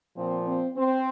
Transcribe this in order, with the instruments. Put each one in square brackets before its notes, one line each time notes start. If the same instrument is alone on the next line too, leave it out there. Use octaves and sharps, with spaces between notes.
[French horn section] A#2 F3 C4
C4
C4